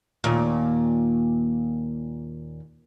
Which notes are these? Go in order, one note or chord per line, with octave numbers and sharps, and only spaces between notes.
D#2 A#2